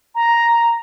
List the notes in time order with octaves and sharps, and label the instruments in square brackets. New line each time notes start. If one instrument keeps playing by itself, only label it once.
[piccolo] A#5